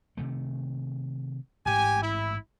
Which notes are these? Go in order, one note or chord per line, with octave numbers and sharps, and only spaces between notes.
C3 D#3 A3
A1 G#2 G4 G#5
E4